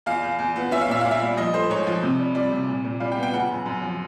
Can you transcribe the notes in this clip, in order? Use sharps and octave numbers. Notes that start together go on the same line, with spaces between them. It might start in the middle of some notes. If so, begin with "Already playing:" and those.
E2 F5
E2
E2
B3
C#4 E5
F5
A#2 E5
A#2 F5
E5
G3
F3 D#5
A3 C5
G#2 C#5
F3
C3
G3
G3 D5
C3
A#2
A#2
G3 F5
G5
B3
G5
C#3 F#5
F#2
F#2
F3